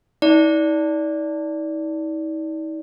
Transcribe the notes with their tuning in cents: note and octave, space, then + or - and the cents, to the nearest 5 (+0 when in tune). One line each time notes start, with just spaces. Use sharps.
D#4 +45 D5 -15